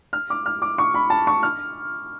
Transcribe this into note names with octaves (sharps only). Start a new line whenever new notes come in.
F6
D6
F6
D6
C#6
B5
A5
C#6
F6